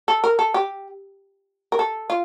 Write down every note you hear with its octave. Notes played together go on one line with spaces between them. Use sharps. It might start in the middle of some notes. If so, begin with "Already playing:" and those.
A4
A#4
A4
G4
A#4
A4
F4